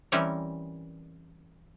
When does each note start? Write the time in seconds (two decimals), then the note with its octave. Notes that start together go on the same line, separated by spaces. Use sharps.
0.12 E3 G3 C4 C#4 A#4